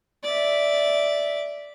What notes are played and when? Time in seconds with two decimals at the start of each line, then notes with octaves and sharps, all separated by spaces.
0.24 D5 E5